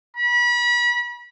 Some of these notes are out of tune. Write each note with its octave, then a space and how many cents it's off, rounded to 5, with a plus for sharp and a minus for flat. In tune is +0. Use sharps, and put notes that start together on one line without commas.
B5 -35